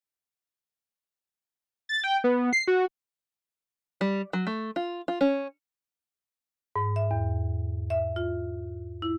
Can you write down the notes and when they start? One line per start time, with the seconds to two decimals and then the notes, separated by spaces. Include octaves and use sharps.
1.89 A6
2.04 G5
2.24 B3
2.53 C7
2.68 F#4
4.01 G3
4.33 F#3
4.47 A3
4.76 F4
5.08 F4
5.21 C#4
6.76 G#2
6.96 E5
7.11 E2
7.90 E5
8.16 F4
9.02 E4